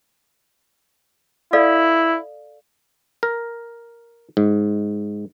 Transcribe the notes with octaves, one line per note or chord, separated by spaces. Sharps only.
E4 A4 D5 F5
A#4
G#2